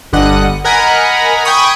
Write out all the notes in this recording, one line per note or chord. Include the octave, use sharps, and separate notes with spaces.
G1 D3 G3 D#5 F#5 F#6
A#4 D#5 F#5 G#5 A#5 B5
G5 G#5 B5 C#6 D#6